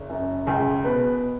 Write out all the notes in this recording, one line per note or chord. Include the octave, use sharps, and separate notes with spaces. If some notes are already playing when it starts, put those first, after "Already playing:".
Already playing: F#1
F#2
C#2 G#4
B2 B4